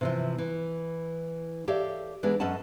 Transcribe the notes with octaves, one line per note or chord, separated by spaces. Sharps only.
C3 E3 F3
E3
G4 A4 C#5 D5 E5 F5
E3 G#3 B3 D4
F#2 C#4 A4 D#5 F#5 A5